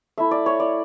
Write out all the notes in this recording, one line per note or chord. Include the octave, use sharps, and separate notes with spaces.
A3 E4 E5
D5
C#5
D5